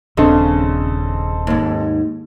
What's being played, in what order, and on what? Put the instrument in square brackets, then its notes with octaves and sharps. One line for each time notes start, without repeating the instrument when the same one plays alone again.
[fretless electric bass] D#1 D4 [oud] C#3 [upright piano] C4 A4 D#5
[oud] D#2 G#2